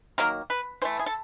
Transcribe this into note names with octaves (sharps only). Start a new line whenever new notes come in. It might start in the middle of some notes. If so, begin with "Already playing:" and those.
D#3 F#3 A#3 A#4
B4
E3 A3 C5
G#4
A4